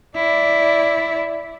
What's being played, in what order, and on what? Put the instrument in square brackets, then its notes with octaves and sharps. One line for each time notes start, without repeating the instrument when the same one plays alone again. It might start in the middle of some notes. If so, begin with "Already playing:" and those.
[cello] E4 D5